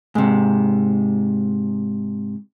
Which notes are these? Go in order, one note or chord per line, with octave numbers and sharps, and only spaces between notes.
G#2 C3